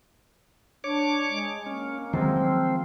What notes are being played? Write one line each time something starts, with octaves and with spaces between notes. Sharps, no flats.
D4 C#5 D6
G#3
A#3 C#4
D#3 F3 F#3 G#3 C4